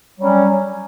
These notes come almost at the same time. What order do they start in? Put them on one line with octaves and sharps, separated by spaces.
F#3 G3 C#4